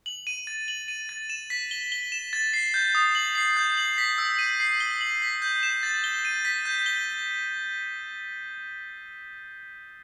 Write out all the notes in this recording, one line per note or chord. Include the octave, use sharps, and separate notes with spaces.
F#7
D#7
A6
F#7
D#7
A6
E7
B6
G7
G7
E7
A6
C7
G6
D#6
F#7
C7
G6
F#7
B6
E6
D#7
C7
G7
F#7
B6
G6
E7
A6
G7
D#7
B6
G6
G7